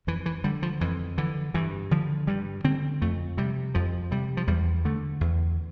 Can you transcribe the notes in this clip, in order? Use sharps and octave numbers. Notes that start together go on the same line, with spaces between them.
F2 E3
E3
D3 G3
F3
F2 E3
D3 E3
G2 E3
D3 F3
G2 G3
D3 C4
F2 A3
C3 G3
F2 F3
C3 G3
F3
E2 G3
D3 A3
E2